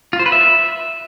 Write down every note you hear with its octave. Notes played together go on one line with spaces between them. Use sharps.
F4
C5
B4
E5